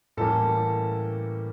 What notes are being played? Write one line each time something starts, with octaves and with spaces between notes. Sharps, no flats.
A2 E3 G3 A#3 C#4 A4